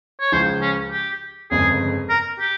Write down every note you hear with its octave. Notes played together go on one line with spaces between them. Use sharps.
C#5
C#2 C#3 F3 C5
C#4
G4
G1 F2 C#3 G#3 G#4
A#4
G4